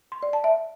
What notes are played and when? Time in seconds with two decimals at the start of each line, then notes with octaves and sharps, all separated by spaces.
0.12 C6
0.23 D5
0.33 A5
0.44 E5